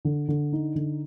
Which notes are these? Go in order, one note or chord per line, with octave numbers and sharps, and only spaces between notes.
D3
D3
D#4
D3